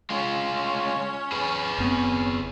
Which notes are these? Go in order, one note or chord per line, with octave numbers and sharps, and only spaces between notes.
G#3 C#4 F4 C#5
G#4 B4
F#1 B3 C4